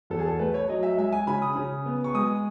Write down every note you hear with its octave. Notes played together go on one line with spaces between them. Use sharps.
E2 A4
G#4
A4
A3 B4
C#5
F#3 D#5
E5
G#3 E5
G#5
C#3 B5
D#6
C#3
B3
C#6
G#3 D#6